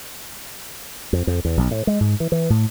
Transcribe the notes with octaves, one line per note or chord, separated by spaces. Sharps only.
F2
F2
E2
B1
A2
G#3
G#2
E3
E3
A2